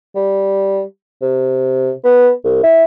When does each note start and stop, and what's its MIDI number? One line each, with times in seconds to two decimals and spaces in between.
0.15 0.82 55
1.22 1.91 48
2.04 2.30 59
2.44 2.59 36
2.63 2.84 64